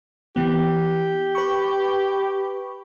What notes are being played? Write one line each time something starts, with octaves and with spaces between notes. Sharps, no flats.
E3 B3 G4
B4 B5 C#6